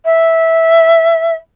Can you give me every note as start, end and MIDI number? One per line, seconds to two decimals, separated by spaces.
0.05 1.36 76